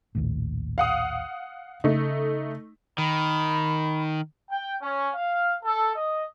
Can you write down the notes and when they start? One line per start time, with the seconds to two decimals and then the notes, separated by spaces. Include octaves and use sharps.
0.15 A#1 D#2 A2
0.78 F5 F#5 D#6
1.84 C#3 A3 D#4
2.98 D#3 B5
4.51 G5
4.82 C#4
5.14 F5
5.63 A4
5.95 D#5